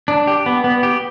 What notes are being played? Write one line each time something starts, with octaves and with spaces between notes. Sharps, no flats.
D4
G4
B3
B3
G4